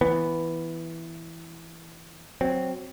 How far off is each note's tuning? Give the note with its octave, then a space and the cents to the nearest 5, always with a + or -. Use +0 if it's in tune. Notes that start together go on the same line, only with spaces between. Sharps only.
E3 +0 B3 +0
F#3 +0 C4 +0